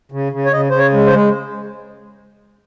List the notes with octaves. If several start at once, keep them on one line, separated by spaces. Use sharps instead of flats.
C#3
C#3
C#5
C#3 D#5
C#3 C5
C#5
G#3
C5
G#3